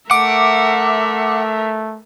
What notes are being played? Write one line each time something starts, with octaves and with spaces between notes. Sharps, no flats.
A3 A#4 E5 F#5 D6